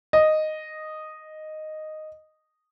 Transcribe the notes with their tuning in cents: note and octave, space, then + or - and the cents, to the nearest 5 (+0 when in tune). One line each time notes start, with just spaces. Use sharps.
D#5 -5